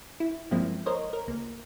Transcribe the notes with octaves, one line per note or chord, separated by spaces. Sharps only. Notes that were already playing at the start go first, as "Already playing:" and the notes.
E4
G2 F3 G#3 A#3 C4 E4
A#4 C5 C#5 D#5
A#4
C#2 A#3